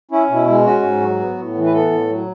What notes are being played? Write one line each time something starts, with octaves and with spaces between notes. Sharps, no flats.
C#4 E4
B2 E4
G#3
C#4 F#4
G#2
F#3
B3
A2
E3
B4
B3 A4
A2
F#3